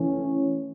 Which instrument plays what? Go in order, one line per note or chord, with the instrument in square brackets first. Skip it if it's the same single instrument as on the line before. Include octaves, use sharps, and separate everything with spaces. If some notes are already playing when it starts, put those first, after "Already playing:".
Already playing: [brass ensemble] E3 A3 C#4